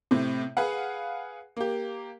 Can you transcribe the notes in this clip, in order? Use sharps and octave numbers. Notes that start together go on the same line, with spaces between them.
A2 C3
G#4 B4 F5 F#5
A#3 G4